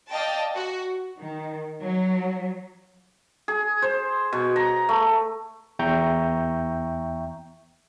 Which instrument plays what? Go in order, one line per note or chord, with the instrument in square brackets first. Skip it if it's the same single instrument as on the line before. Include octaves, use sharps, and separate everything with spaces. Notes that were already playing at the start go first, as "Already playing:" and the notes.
[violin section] D5 D#5 F5 G5 A5
F#4
[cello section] D#3
F#3
[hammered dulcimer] G#4
C5
B2
A#5
A3
[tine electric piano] E2 E5 G5 A#5 C#6 G6